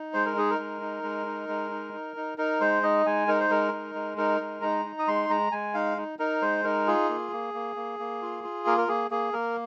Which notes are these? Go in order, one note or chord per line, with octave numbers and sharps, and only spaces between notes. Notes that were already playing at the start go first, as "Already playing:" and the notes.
Already playing: D#4
G#3 C5
A#4
D#4 G#4
A#4
G#3
D#4
G#3
D#4
G#3
D#4
D#4
D#4
D#4 A#4
G#3 C5
D#4 D#5
G#3 G#5
D#4 A#4
C5
G#3 A#4
D#4
G#3
D#4 A#4
G#3
D#4 A#5
D#4
D#6
G#3 C6
G#3 A#5
G#3 G#5
D#4 F5
D#4
D#4 A#4
G#3 C5
D#4 A#4
F4 G#4
A#3
A#3
A#3
A#3
A#3
F4
F4
A#3 A#4
A#4
A#3 G#4
A#3 G#4
A#3 A#4